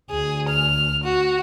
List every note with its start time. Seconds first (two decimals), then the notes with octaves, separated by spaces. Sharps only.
0.11 D2 G#4
0.49 F6
1.04 F#4